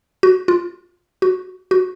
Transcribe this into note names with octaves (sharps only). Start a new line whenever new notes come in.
F#4
F4
F#4
F#4